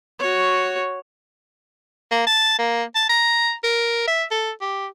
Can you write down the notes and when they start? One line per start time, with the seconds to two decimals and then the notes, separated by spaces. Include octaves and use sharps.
0.19 F#4 C#5
2.11 A#3
2.27 A5
2.58 A#3
2.95 A5
3.09 A#5
3.63 A#4
4.08 E5
4.31 A4
4.61 G4